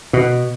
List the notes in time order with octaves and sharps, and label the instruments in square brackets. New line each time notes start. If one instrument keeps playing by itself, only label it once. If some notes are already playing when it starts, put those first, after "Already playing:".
[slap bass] B2